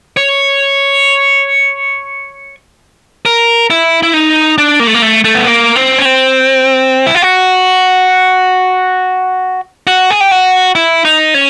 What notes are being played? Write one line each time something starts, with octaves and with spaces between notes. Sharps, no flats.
C#5
A#4
E4
E4
D#4
D4
A#3
A3
A#3
A3
A3
B3
A#3
C4
C#4
C4
E4
F4
F#4
F#4
G#4
G4
F#4
E4
D#4
C#4